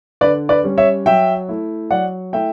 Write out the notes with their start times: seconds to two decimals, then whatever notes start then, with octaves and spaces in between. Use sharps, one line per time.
0.21 D3 B4 D5
0.49 B4 D5
0.64 G3 C#4
0.78 C#5 E5
1.06 F#3 E5 G5
1.49 A3 E4
1.91 F#3 D5 F#5
2.33 A3 E4 E5 G5